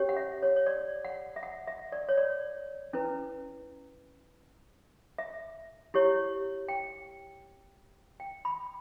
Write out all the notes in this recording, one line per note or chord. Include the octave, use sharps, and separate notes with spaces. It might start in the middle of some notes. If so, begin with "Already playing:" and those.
Already playing: C#4 G4 C#5
F#5
E5
C#5
C#5
D5
F#5
E5
F#5
E5
D5
C#5
D5
C#4 E4 B4
E5
E4 G4 C#5
G5
G5
B5